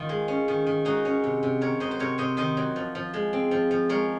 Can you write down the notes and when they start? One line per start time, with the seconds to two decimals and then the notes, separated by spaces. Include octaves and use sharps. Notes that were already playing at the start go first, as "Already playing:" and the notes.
Already playing: D#3 F4
0.09 G#3
0.28 C#4
0.48 D#3
0.67 D#3
0.85 G#3 D#4 F#4
1.05 C#4
1.24 C3
1.43 C3
1.61 D#3 A#4 C#5
1.80 F#3 C5 D#5
1.91 C5
1.99 C3 A#4 C#5
2.18 C3 C5 D#5
2.37 D#3 C5 D#5
2.57 F#3
2.76 F3
2.95 F3
3.14 G#3
3.33 C4
3.51 F3
3.71 F3
3.89 G#3 A#4 C#5